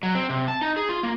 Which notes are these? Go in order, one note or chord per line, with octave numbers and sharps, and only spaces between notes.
F#3
C4
C3
A5
D#4
G#4
F4
A#3